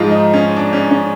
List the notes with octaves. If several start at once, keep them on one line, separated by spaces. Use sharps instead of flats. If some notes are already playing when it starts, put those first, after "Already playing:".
Already playing: G#2 F3 G#3 F4
D#4
C#4
D4
C#4
C#4